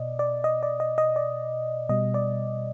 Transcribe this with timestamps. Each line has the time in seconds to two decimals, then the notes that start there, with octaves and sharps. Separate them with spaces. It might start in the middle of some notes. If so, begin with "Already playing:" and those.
Already playing: B2 D5 D#5
0.19 D5
0.44 D#5
0.63 D5
0.80 D#5
0.98 D#5
1.16 D5
1.89 B2 G3 D#5
2.14 D5